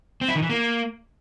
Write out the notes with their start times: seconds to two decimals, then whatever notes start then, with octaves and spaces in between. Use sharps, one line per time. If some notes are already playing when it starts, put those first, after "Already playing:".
0.21 C4
0.28 E4
0.35 D#3
0.43 E3
0.50 A#3